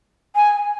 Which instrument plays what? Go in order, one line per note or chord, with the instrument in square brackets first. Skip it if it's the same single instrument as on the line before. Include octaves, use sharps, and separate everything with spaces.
[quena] G#5